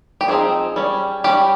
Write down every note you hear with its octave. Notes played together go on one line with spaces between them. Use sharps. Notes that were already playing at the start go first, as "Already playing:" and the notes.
G4
F3 C4 D#4 G#4
G3 C#4
G3 C#4 G4